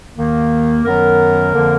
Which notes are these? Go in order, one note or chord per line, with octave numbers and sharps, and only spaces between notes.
D#2 D#3 A#3
F#2 D#3 F#3 B3 A#4
F2 D3 F3 A#3